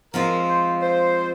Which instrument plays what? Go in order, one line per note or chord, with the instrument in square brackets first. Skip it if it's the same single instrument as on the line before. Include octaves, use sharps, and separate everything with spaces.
[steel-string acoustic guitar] F3 G#3 C4 F4 [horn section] A#4
[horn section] C5
C5